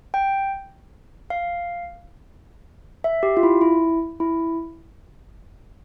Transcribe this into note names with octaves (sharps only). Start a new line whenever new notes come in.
G5
F5
E5
G4
F4
E4
E4
E4